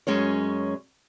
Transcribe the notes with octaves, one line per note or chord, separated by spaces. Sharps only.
F#2 G#3 C#4 C#5